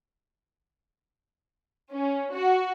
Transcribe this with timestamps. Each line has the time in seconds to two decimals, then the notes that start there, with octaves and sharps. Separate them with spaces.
1.92 C#4
2.33 F#4